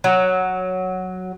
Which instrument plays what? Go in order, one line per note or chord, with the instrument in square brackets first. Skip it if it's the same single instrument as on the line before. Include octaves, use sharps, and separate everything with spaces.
[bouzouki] F#3